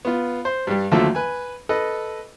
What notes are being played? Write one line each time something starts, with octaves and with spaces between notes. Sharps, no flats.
B3 F4
C5
G2 G3
D#2 D3 F3 F#3 A3 E5
B4 G#5
A4 B4 D#5